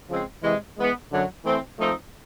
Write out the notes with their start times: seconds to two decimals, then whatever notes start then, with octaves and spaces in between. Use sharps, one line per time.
0.10 C#3 F3 G#3 C4
0.43 C3 E3 G#3
0.77 E3 G#3 B3
1.11 F#2 D3 F#3
1.45 E3 A3 C4
1.78 F3 A3 C4 D#4